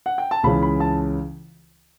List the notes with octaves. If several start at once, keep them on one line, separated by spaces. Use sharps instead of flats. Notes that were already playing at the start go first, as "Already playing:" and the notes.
F#5
G5
A5
C#2 C#3 E3 B5
B5
A5